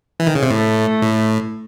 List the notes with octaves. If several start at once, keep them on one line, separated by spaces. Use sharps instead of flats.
E3
D#3
C#3
C3
A2 A3
A2